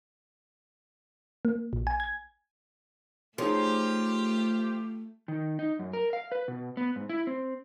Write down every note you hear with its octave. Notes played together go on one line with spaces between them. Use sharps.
A#3
A#1
G#5
G#6
F3 A3 D#4 F4 G4 G#4 C#5
D#3
D#4
F#2
A#4
F5
B4
B2
B3
G#2
E4
C4